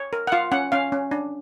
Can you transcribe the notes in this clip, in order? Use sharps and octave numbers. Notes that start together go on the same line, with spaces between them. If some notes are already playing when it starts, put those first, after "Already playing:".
Already playing: C#5
A#4
F#5
F4 F5
C#4 F#5
C#4 F5
C#4
D4